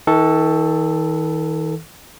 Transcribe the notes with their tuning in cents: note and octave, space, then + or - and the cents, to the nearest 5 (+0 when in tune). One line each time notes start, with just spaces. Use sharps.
D#3 +45 A4 +0